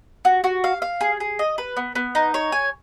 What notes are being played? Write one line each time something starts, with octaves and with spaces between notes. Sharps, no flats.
F#4
F#4
F5
F5
G#4
G#4
D#5
B4
B3
B3
D#4
C#5
G#5